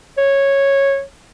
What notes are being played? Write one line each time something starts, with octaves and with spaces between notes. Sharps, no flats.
C#5